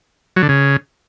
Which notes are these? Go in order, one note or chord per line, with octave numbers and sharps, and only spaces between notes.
F#3
D3
C#3